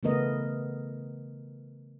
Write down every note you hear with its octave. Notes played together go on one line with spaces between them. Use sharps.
C#3 E3 A3 B3 A#4 D#5